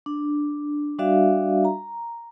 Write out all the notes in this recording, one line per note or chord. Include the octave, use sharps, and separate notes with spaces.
D4
G3 D4 F#4 D5 E5 F5
A#5